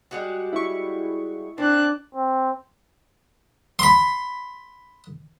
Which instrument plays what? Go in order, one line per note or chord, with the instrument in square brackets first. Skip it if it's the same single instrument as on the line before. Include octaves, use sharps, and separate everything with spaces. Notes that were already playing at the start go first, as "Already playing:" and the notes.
[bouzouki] G3 G#3 F#4
[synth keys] E4 C#6
[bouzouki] C4 [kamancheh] D4 F#6
[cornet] C4
[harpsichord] B5 C6